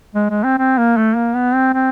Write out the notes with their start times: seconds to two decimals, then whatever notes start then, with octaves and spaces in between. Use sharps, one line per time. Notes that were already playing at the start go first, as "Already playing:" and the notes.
0.15 G#3
0.29 G#3
0.44 C4
0.58 C4
0.78 A#3
0.97 A3
1.16 A#3
1.35 B3
1.54 C4
1.74 C4